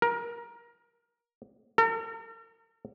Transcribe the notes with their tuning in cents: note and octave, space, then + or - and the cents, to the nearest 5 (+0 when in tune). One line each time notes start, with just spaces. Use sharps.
A#4 +20
A#4 -45